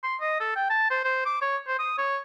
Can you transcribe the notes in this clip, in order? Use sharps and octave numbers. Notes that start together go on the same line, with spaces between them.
C6
D#5
A4
G5
A5
C5
C5
D6
C#5
C5
D#6
C#5